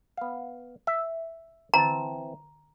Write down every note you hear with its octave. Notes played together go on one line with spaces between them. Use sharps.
B3 F5
E5
E3 C4 A5 A#5